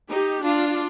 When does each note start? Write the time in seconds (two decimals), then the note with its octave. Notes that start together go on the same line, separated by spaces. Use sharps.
0.10 D#4 G4
0.43 D4 F4